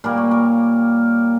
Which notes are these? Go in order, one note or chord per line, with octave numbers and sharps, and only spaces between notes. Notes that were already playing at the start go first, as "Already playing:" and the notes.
A#2 G3 A#3 A#4
C#5
A#4